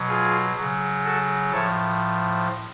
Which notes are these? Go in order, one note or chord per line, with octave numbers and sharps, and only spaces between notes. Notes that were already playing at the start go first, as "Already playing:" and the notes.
Already playing: B2 F#3
F4 G#4
C#3 F#3
F#4 A4
A2 F3 A4 C#5